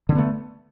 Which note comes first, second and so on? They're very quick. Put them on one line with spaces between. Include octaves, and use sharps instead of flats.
D3 C#4 B3 A3